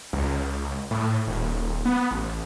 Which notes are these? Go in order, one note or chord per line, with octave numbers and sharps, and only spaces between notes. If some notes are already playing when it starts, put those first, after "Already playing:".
C#2
A2
D#1
B3
A1